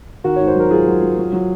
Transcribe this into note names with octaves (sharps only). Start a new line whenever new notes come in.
D#3 F#4 A#4
G#2 C#5
C5
F#3 A#4
F#3 F4 G#4
F#3
F#3
F#3
F#3